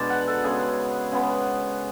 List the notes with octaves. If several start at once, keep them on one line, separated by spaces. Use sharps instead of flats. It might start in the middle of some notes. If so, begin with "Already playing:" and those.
Already playing: B2 G#3 D4 B4 D5 A5
F#5
A4
C#3 G#3 B3 G#4
C#3 G#3 B3